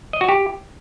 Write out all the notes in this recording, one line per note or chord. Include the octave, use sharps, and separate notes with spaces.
D#5
F#4
G4